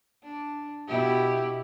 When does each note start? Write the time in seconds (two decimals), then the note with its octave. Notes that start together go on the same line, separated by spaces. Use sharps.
0.23 D4
0.88 B2 E4 G4